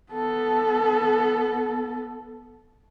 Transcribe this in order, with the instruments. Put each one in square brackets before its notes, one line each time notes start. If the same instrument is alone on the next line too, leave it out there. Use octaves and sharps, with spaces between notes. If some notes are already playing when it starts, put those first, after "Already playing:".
[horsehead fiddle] B3 A4